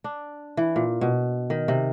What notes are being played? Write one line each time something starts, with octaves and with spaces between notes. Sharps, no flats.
D4
E3
A#2
B2
D#3
C3